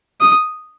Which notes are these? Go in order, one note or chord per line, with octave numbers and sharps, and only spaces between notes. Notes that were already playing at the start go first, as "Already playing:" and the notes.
D#6